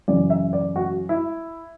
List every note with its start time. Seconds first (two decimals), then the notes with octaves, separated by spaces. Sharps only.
0.08 F#2 C#3 E3 D5
0.30 E5
0.53 D5
0.76 F#4
1.09 E4